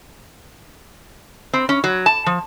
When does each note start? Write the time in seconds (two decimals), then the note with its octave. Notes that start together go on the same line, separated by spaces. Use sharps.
1.53 C4
1.69 C#4
1.84 F#3
2.06 A5
2.26 F3